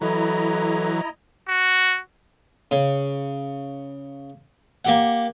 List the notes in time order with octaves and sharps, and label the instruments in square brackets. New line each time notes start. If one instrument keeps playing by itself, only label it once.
[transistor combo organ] E3 F#3 [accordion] E4 D#5 A#5 [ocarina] A4
[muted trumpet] F#4
[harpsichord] C#3
A#3 G4 F#5